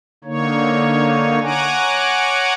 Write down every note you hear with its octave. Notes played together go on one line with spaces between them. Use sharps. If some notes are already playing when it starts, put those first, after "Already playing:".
D3 A#3 D#4 C#5
C#5 F#5 G#5 A#5 D6